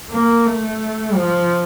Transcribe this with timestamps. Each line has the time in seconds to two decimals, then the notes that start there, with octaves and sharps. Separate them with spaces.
0.10 A#3
0.46 A3
1.15 F3